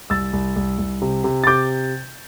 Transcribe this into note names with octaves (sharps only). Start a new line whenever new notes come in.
C2 E6 A6
C2
C2
C2
C3
C3
A6
C3 D6 G6